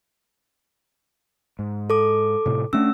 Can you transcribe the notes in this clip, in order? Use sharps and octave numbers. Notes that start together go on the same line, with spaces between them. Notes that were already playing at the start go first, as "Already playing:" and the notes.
G#2
A4 D6
A2 C3
G2 A3 C#4 D4 E6